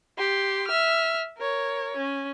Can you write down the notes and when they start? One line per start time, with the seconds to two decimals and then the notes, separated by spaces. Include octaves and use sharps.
0.18 G4 C6
0.68 E5 F6
1.38 A#4 C#5
1.97 C#4